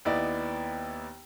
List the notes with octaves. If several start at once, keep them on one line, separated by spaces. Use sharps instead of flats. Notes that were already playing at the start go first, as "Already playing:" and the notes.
D#2 B3 E4 D5 D#5